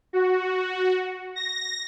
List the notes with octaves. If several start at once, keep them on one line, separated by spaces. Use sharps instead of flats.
F#4
A#6